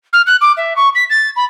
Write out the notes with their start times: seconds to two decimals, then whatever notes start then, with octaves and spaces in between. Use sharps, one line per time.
0.13 F6
0.26 F#6
0.41 D6
0.57 E5
0.76 C#6
0.95 B6
1.09 A6
1.36 B5